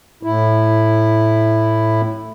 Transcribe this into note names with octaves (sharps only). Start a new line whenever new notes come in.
A2 E4